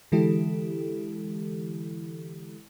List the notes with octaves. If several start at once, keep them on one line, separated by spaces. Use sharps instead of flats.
D3 E3 G#3 E4 G4 A4